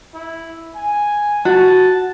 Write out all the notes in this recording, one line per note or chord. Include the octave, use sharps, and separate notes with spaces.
E4
G#5
F#4 A5